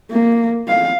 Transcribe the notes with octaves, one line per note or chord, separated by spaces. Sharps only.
A#3
F5